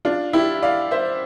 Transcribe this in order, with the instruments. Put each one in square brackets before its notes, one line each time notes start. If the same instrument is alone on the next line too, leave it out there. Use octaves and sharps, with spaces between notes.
[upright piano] D4 F4
E4 G4
D5 F5
C5 E5